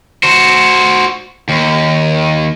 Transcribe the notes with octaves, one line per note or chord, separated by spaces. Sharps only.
F#4 C5
D#2